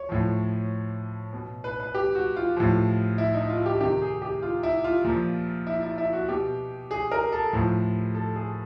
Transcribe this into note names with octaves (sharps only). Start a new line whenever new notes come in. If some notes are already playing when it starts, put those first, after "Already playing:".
Already playing: C#5
A2 F3
B2
B4
B4
G4
F#4
F4
A2 F3
E4
D#4
F4
G4
C3 D#3 G4
G#4
G4
F4
E4
F4
A#2 F3
E4
E4
E4
F#4
B2 G4
G#4
A#4
A4
A2 F3
A4
G#4